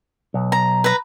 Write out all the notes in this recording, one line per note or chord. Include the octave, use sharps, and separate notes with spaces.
B1
A#5
B4 A#5